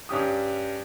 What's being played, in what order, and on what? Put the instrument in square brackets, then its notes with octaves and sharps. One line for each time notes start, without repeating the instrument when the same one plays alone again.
[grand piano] G2 C#4 G4 D#6